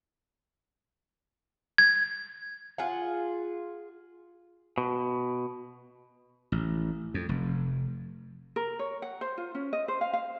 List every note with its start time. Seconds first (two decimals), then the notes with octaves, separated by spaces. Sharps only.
1.78 G#6
2.78 F4 G#4 F#5
4.78 B2
6.52 A1
7.14 F2
7.29 F1
8.56 A#4
8.79 C#5
9.02 F#5
9.21 C5
9.38 F4
9.55 C#4
9.73 D#5
9.88 C5
10.01 F5
10.13 F5